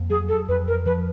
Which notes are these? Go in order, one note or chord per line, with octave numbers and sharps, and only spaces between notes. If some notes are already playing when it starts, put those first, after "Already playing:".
Already playing: F2 A#3
F#3 G#4
A4
F2 B4
A#4
F3 B4